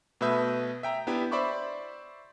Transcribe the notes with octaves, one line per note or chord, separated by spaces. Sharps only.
B2 A3 B4 E5 D#6 G6
E5 G5 A#5
B3 D4 E4 G4 E5
C5 D5 E5 B5 C#6 D6